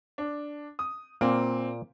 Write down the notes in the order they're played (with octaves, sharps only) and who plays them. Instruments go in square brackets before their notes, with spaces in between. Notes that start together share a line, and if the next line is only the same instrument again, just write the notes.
[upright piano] D4
D#6
[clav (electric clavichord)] A#2 [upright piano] A#3 C4